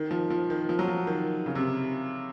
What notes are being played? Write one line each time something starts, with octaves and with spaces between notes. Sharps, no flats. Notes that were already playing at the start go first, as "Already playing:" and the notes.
Already playing: D#3
F3
F3
D#3
F3
F#3
F3
D#3
C#3
C3